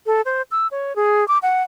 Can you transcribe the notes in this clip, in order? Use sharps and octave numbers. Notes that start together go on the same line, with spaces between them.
A4
C5
E6
C#5
G#4
D6
F#5